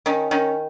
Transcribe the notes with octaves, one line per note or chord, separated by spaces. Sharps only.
D#3 C#4
D#3 C#4